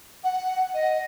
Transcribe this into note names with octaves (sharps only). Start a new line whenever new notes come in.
F#5
D#5